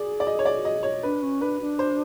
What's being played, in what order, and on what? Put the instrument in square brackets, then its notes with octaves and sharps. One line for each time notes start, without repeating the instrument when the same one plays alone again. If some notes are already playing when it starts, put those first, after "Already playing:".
Already playing: [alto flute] G#4 [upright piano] D5
[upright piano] D5
D#5
C#5
D5
D#5
C#5
[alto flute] D4 [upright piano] B4
[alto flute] C#4
[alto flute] D4 [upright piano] B4
[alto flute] D4
[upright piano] C5